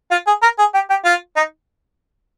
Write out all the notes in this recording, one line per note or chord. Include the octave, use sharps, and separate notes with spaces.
F4
G#4
A#4
G#4
G4
G4
F4
D#4